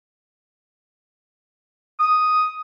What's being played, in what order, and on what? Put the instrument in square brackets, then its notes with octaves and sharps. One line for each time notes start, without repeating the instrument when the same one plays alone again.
[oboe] D#6